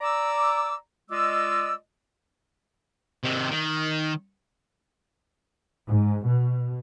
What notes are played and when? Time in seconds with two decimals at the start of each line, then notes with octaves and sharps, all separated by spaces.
0.01 D5 A#5 D6 E6
1.10 G#3 F4 D5 D#5 D6 E6
3.24 C3 D#3
3.52 D#3
5.87 G#2
6.26 B2